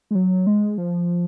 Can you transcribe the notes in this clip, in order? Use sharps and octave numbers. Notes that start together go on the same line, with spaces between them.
G#3
F#3
G#3
F3